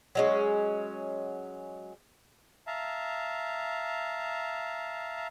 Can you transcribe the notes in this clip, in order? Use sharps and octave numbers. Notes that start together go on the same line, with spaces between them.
F#3 G#3 C#4
E5 F5 A5 A#5